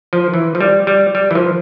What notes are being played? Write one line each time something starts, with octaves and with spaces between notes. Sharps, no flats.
F3
E3
F3
G3
G3
G3
E3
F3